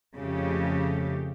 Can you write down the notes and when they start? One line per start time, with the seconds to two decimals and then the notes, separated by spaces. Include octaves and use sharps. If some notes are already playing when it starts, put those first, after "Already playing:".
0.16 F2 C#3 A3 G4